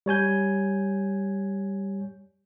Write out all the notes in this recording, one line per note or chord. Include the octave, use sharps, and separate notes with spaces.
G3 C#5 G#5 G6